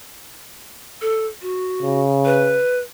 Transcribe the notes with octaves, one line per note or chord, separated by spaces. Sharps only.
A4
F#4
C#3
B4